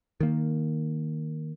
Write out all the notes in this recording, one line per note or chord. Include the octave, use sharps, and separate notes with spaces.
D#3 A#3